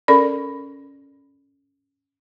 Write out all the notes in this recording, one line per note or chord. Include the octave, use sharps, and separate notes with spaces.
C#4 A4 A#4 D5 B5